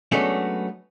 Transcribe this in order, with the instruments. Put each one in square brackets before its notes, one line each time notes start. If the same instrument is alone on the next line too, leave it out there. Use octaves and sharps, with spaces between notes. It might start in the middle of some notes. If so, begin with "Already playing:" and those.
[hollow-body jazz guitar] F#3 G#3 A3 B3 C#4 D4